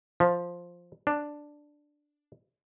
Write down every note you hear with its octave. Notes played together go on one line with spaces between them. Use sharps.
F3
D4